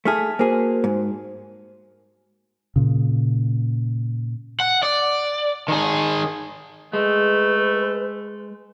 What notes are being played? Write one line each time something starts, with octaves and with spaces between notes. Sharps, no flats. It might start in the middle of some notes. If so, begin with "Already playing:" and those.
A3 G#4 A5 F6 B6
A#3 F#4 G#4 C5
G#2
A#2 C#3
F#5
D5
D#3 G#4
G#3 A3 B4